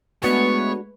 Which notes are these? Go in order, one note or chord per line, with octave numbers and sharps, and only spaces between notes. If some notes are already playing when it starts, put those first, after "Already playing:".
G#3 A3 B3 D4 F#4 B4 C#5